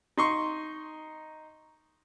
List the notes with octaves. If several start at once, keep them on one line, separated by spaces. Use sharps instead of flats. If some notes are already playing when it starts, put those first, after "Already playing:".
D#4 C6 C#6